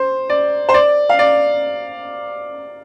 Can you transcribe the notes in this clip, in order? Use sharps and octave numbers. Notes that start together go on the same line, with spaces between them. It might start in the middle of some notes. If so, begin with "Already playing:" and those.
Already playing: C5
D5
C5
D5
F5
D5